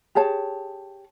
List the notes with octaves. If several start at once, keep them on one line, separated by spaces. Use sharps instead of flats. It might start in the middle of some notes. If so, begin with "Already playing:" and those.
G4 G#4 C#5 A5